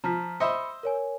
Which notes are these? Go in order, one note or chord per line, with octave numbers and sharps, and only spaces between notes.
F3 A#5 F6 B6
C5 D#5 E5 B5 C#7
A#4 C#5 G#5